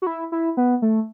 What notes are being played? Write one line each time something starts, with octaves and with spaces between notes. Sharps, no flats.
F#4
E4
E4
B3
A3